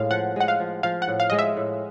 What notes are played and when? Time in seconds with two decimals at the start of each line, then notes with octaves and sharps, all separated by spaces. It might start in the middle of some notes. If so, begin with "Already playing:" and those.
Already playing: A2 G#3 F5
0.11 F3 F#5
0.36 G#3 F#5
0.48 F5
0.60 F3
0.83 F3 F5
1.02 F#5
1.08 A2
1.20 F5
1.30 G#3 D#5
1.39 E5
1.57 A2